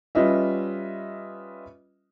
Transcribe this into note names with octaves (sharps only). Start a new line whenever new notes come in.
G3 C#4 F4 B4 D#5 E5